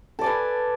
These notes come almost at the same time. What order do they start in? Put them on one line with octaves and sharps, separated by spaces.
A4 D5 G#5 B4